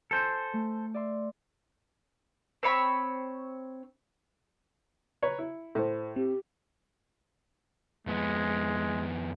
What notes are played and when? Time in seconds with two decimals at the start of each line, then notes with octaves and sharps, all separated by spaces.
0.11 A4 C5 G#5
0.53 A3
0.94 D5 E5 C6
2.63 C4 C#5 B5 C#6
5.22 B4 C#5 A#5
5.38 E4
5.75 A2 A4 C5
6.16 C4 G4
8.07 F2 G#3 B3